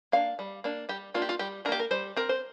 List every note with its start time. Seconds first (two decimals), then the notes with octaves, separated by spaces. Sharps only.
0.12 A#3 D4 F5
0.39 G3
0.64 A#3 D4
0.89 G3 G4
1.14 A#3 D4 F4
1.22 G4
1.29 F4
1.39 G3 G4
1.65 D4 A#4
1.69 A#3 G4
1.80 A#4
1.91 G3 C5
2.16 C4 A#4
2.29 C5